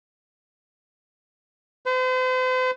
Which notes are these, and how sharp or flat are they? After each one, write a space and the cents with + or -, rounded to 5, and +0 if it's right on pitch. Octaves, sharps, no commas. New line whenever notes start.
C5 -40